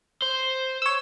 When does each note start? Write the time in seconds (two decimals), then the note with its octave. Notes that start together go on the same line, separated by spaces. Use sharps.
0.22 C5
0.82 C#5 E6